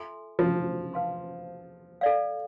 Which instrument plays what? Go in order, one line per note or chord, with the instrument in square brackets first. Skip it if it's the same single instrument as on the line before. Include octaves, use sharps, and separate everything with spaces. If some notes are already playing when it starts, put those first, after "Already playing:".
Already playing: [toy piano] F4 A4 E5 G#5 C6
[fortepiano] F3
[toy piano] B4 F5 A5 C6
A4 D5 F5